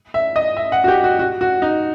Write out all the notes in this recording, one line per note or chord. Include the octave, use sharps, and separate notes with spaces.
E5
D#5
E5
F#5
F#4
G4
F#4
F#4
F#4
D#4